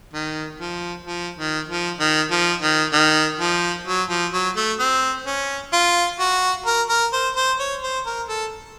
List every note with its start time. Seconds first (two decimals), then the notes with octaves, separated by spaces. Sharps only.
0.14 D#3
0.61 F3
1.07 F3
1.38 D#3
1.69 F3
2.00 D#3
2.31 F3
2.62 D#3
2.93 D#3
3.40 F3
3.87 F#3
4.09 F3
4.33 F#3
4.56 A3
4.80 C4
5.26 C#4
5.73 F4
6.20 F#4
6.66 A#4
6.89 A#4
7.13 C5
7.36 C5
7.60 C#5
7.83 C5
8.06 A#4
8.29 A4